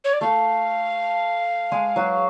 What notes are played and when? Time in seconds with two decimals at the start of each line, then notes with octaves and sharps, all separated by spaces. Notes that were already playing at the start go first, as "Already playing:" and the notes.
0.04 C#5
0.13 D5
0.21 A3 A4 F5
1.72 G#3 G#4
1.96 F#3 F#4